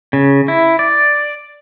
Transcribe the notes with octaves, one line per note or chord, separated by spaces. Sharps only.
C#3
E4
D5